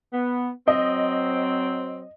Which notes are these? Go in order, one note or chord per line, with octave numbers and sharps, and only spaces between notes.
B3
F#3 C4 D#5